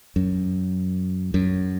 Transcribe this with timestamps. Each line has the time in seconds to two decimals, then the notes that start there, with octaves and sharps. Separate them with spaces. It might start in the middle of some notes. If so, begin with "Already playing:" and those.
0.16 F#2
1.34 F#2